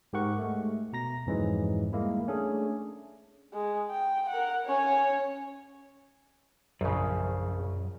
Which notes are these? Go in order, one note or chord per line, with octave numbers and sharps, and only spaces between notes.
G#2 G4 A#4 F#5 C#6
G#3 A3
B2 A#5 A#6
F2 G#2 E3 F#3 G#3
G3 G#3 A#3 E4
A3 C#4 D4 G#4
G#3
G5
A#4 F#5
C#4 C#5
A#1 F#2 C#3